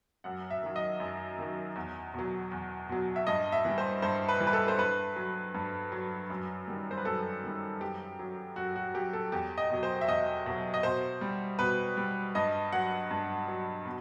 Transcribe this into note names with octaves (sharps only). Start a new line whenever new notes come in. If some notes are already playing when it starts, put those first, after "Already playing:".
F#2 F#5
E5
D#3 F#3
D#5
F#2
D#3 F#3
E2
B2 F#3
E2
B2 F#3
E5
G2 D#5
E5
E3 G3
C5
G2 C5
B4
E3 G3
B4
A4
C5
G2 B4
F#3
G2
F#3
F#2
D#3 G3
C5
B4
F#2 A4
D#3 G3
F#2 G4
F#3
F#2 F#4
F#4
F#3 G4
A4
E2 G4
D#5
B2 F#3
C5
E5
E2 D#5
B2 F#3
D#5
B2 C5
G3
B2 B4
G3
G2 D#5
F#3 F#5
G2
F#3
B2